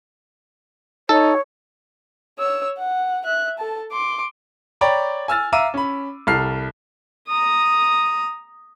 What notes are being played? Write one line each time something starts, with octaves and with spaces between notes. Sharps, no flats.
D#4 A4 C#5
C#5 E6
F#5
E5 F#6
A4 A5
C6 D6
C#5 D5 G5 A#5 B5
G#5 E6 F6 A6
E5 F5 A#5 D6 E6 D#7
C#4 B5
C2 A4 F6 C7
A#5 D#6